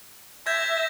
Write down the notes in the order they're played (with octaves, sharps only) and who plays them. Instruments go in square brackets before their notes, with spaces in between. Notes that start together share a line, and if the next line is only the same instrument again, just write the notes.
[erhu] E5 [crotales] G6 G#6 A#6